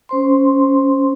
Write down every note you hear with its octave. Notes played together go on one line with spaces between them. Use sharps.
C#4 C5 C6